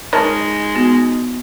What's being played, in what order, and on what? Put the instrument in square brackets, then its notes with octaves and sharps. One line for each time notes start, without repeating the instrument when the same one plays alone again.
[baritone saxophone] G#3 [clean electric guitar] D#4 [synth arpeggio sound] A#4 C#5 A5
[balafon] B3 F#4